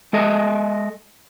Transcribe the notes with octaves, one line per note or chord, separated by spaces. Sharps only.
G#3 A4 D#5 E5